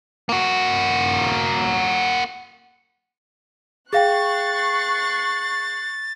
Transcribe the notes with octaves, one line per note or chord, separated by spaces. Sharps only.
A#3 F#4
G#4 F5 G5 C#6 F#6 A6 C7